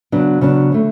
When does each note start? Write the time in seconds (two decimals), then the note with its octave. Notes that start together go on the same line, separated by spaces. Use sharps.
0.12 C#3 F#3 B3 D4
0.41 C#3 F#3 B3 D4
0.72 D3 A3